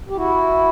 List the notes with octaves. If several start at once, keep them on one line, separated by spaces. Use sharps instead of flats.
G4
E4 F#4